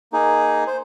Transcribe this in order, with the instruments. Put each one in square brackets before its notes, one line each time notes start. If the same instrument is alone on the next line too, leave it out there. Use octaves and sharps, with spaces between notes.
[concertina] A#3 D#4 G#4
C5